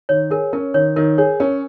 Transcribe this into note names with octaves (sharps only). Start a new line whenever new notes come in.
D#3 C#5
G#4 A#4
C#4 A#4
D#3 C#5
D#3 A#4
G#4 C#5
C#4 A#4